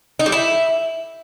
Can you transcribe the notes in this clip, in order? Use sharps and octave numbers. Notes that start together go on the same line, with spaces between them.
D#4
G3
E4